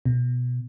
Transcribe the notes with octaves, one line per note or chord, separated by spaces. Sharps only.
B2